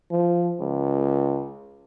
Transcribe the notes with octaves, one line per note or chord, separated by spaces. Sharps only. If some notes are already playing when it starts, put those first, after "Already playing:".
F3
C#2